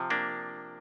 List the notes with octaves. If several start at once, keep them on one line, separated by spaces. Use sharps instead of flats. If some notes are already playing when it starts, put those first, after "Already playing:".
Already playing: C3 F3
A#3 D4